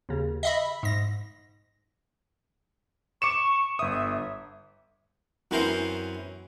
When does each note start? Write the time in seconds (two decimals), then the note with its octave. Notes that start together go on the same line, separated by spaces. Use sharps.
0.09 D#2 C#3
0.43 D#5 E5 B5
0.83 G#2 A#6
3.22 C#6 D6 C#7 E7
3.79 G1 E5 D#6
5.51 F#2 E3 C4 C#4 A#4 C5